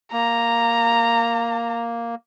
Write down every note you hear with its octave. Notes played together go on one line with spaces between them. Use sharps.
A#3 A#5